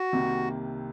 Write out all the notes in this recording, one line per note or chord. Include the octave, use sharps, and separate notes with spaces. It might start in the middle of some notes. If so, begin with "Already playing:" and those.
Already playing: F#4
C2 C3 D#3 A#3